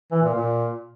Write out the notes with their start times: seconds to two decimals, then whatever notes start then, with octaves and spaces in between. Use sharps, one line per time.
0.11 E3
0.23 A#2
0.34 A#2